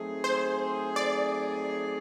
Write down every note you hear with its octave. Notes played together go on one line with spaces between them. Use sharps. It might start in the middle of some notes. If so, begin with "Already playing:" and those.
Already playing: F#3 A3 C4 D#4 G#4
C5
D5